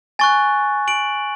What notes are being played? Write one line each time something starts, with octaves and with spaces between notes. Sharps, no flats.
G#5 C#6 F#6 A6
D7 F#7